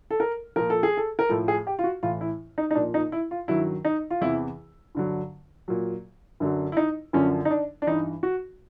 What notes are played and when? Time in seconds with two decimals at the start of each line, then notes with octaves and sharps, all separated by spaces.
0.11 A4
0.20 A#4
0.56 A#2 F3 A#4
0.70 A4
0.83 G#4
0.97 A4
1.19 A#4
1.29 A2 F3 A4
1.48 G#4
1.67 G4
1.79 F4
1.84 F#4
2.03 A2 E3 F4
2.21 E4
2.58 D#4
2.71 D#4
2.75 A#2 F3 D4
2.94 D#4
3.12 E4
3.31 F4
3.48 G2 D#3 F#3 E4
3.85 D#4
4.10 F4
4.21 E2 C3 E3 E4
4.95 G2 D3 F#3
5.68 A#2 F#3
6.40 F#2 D3 F#3
6.72 E4
6.77 D#4
7.13 F#2 D3 F3 C#4
7.45 D#4
7.51 D4
7.82 D4
7.87 G2 E3 D#4
8.23 F#4